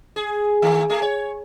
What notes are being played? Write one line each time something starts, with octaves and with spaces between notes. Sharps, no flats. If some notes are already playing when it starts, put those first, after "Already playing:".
G#4
D#3 A3
A3 G#4
C#5